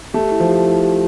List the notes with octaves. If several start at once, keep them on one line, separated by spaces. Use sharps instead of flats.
A3 G4
E4
F3
G4
E4
G4